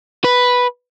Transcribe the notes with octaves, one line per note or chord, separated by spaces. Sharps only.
B4